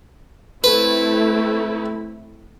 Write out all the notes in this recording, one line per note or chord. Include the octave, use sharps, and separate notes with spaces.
A3 C4 E4 B4